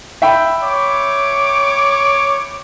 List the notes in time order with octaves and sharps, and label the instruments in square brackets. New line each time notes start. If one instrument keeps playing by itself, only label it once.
[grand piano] E5 G5 B5
[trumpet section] C#5 D6